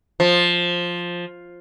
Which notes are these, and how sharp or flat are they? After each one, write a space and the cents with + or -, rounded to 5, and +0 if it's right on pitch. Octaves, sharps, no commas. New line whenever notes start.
F3 +5